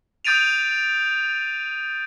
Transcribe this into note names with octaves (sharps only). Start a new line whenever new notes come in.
D#6 G6 A6 D7 D#7 F7